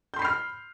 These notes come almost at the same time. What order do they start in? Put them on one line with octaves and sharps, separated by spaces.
G6 C6 B5 C7 F6